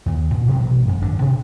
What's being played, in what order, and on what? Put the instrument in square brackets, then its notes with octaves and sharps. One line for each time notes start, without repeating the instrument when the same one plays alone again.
[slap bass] D#2
A#2
A1 B2 F#3 C4
F2
D#1 G#1 D3 D4
B2